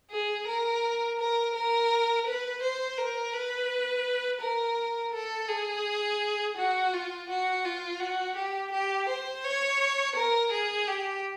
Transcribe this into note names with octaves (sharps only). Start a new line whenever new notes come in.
G#4
A#4
A#4
A#4
B4
C5
A#4
B4
A#4
A4
G#4
F#4
F4
F#4
F4
F#4
G4
G4
C5
C#5
A#4
G#4
G4